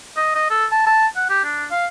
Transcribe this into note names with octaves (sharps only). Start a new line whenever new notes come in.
D#5
D#5
A4
A5
A5
F#5
G4
D4
F5